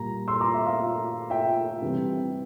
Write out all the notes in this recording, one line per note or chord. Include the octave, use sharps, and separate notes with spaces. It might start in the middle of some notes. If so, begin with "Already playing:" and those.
Already playing: A#2 G3 A#5
C6 E6
A#5 D6
E5
F5
E5 G5
C3 E3 G3